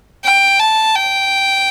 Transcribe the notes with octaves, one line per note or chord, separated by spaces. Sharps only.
G5
A5
G5